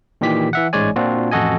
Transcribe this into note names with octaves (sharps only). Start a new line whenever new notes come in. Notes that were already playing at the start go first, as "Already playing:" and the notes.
A#2 D#3 E3 G4 B6
E3 E5 F#5
A1 G#2 G#3 C#5 D5 G#5
A#2 C4 D4 F4 F#4
A1 F2 F#4 A4 D#5 G#5